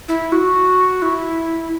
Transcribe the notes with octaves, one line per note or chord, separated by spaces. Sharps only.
E4
F#4
E4